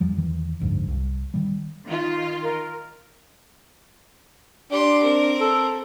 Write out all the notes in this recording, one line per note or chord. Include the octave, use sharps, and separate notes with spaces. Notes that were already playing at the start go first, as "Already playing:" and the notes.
E2 F3 G3
E2 D#3 E3
F#1 D2 G#2 F3
C2
D#3 E3 G3
D#3 F4
A#4
D4 G4 C6
C4 A#4
A4